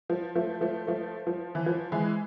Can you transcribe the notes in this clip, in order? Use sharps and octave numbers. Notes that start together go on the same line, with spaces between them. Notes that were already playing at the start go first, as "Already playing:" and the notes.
F3
F3 A3
F3 A3
F3 A3
F3
E3
F3
E3 G#3